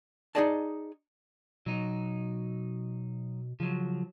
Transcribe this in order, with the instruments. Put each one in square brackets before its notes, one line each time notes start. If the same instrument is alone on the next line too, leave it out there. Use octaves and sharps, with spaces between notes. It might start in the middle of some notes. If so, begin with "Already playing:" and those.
[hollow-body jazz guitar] D#4 F#4 G#4 D5 D#5 A5
[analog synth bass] B2 [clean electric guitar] F#3 D#4
[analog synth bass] C#3 [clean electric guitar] F3 F#3